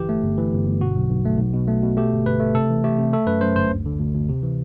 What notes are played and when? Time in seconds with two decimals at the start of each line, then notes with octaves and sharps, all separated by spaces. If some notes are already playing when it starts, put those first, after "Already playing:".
Already playing: G1 E3 G4
0.09 A3
0.23 G1
0.38 E3
0.52 G1
0.66 G1
0.81 B2 F#4
0.96 B1
1.09 B1
1.25 A3
1.38 B1
1.54 B2
1.67 A3
1.82 B2
1.97 A3 G4
2.12 G1
2.25 G1 B4
2.40 A3
2.55 C3 A4
2.70 E3
2.84 A3 G4
2.98 C3
3.13 A3 A4
3.27 F#2 B4
3.41 F#2 C5
3.56 G1 C5
3.71 D2
3.86 D3
3.99 D2
4.14 D2
4.29 C3
4.43 E3